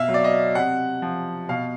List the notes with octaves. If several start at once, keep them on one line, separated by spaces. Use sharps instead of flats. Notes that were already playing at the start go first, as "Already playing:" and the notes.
Already playing: B2 E5 F5
F#3
D5
D#5
C3 F#5
F3
B2 F5